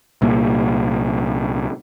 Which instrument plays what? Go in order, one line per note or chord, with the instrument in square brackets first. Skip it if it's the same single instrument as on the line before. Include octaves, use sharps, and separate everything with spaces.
[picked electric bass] C2 A#2 A#3